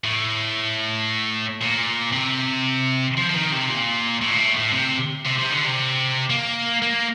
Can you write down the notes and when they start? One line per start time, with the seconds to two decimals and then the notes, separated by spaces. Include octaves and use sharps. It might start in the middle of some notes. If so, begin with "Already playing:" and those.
0.04 A2
1.61 A#2
2.12 C3
3.18 F3
3.30 F3
3.34 D#3
3.52 C3
3.70 A#2
4.21 A2
4.31 A#2
4.38 A2
4.57 A2
4.73 C3
5.26 C3
5.39 C3
5.51 D3
5.65 C3
6.30 A#3
6.82 A#3